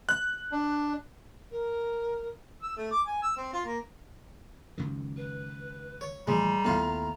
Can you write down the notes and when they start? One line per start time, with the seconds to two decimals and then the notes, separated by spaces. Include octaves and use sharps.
0.09 F#6
0.52 D4
1.51 A#4
2.63 E6
2.77 A3
2.92 D6
3.07 G#5
3.23 E6
3.37 C4
3.53 F4
3.65 A#3
4.78 C#2 F#2 D#3
5.17 B4
6.01 C#5
6.27 A2 E3 F3 G3 G#3 A#5
6.65 D#2 A2 B3 F4